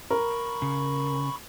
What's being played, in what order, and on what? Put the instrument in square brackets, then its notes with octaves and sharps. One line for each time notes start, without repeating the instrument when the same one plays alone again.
[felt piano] A#4 [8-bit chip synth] B5 C#6
[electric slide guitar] C#3